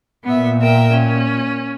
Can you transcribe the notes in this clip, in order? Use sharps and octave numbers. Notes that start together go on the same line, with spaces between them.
A#2 B3 E5
A#4 E5 G5
C#4